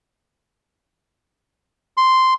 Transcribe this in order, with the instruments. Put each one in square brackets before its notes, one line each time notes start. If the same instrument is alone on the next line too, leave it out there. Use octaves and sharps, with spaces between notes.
[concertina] C6